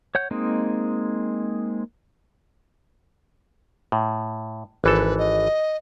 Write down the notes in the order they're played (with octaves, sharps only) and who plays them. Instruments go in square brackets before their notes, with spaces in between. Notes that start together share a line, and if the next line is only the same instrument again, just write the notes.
[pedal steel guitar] C#5 F#5 G6
G#3 A#3 C4 D#4
[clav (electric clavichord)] A2
[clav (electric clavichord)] G#1 E3 A4 [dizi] B4
[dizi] D#5